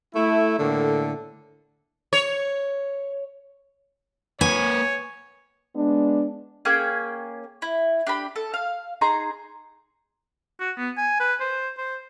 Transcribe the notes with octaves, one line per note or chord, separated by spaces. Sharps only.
A3 E4
A2 D3 A#3 A4
C#5
A#3 B4 C#5 G#5
G#3 B3 D4
A#3 C#4 G#4 G5
E4
D4 G4 B5
A4
F5
D#4 G#4 A#5 C6
F#4
B3
G#5
B4
C5
C5